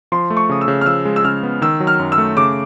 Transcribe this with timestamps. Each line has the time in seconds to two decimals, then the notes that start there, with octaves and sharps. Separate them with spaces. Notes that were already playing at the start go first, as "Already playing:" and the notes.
0.12 F3 C6
0.30 A3
0.37 C#6
0.49 C#3 D#6
0.61 E6
0.68 C#3
0.81 F6
0.86 F3 E6
1.05 G#3
1.16 E6
1.25 C#3 F6
1.43 B3
1.62 D#3 E6
1.80 F#3
1.87 F6
1.99 F#2
2.12 E6
2.18 A3
2.37 C#3 D6